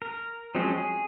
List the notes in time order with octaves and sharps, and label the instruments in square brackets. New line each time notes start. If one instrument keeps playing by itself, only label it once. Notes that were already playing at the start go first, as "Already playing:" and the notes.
[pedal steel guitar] A#4
F3 F#3 G#3 C4 C#4
G#4